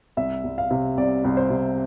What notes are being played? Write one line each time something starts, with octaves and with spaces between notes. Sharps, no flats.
C2 E5
C2
F5
C3
C2 D5
C2
C5
C3